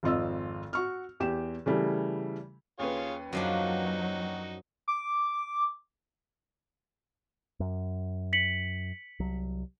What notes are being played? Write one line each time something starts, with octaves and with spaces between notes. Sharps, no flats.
G#1 F2 F4 D#5 E6
F#4 C#6 F6
E2 G4 E7
C#3 E3 G3 A3
D#2 C#4 F4 G#4 B4 C#5
F#2 F3 F#3 D4 D#4 F#4
D6
F#2
B6 C#7 F#7
C2 F#3